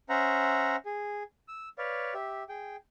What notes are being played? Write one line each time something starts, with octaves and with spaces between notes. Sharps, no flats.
C#4 C5 E5 F#5 A#5
G#4
E6
B4 C#5 D5 F5
G4 E5
G#4 G5